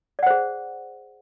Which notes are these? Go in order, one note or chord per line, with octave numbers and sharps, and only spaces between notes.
G#4 C5 D5 F#5